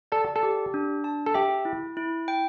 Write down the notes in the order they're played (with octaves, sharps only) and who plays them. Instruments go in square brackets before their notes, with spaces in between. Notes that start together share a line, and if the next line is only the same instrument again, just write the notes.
[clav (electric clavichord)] A4 [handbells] D5
[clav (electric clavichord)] A4
[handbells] G4
D4
A5
[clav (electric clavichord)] A4
[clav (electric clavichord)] G4 [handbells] E5
[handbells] E4
E4
G5